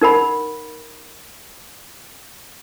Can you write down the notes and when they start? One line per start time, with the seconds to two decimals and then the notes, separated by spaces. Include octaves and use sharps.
0.01 D#4 A#4 F#5 B5